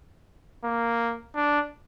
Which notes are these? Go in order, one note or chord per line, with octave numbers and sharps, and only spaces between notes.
A#3
D4